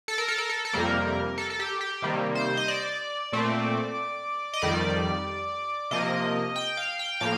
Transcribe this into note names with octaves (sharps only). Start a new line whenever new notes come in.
A4
A#4
A4
A#4
A4
A4
F2 C3 G3 A#3 A#4
A4
A4
G4
G4
C3 D#3 G3 A#3
C5
D#5
D5
A#2 A3 C4
D#5
F2 D#3 G3 D5
C3 F3 A#3 D#5
G5
F5
G5
A2 F3 A#3 F5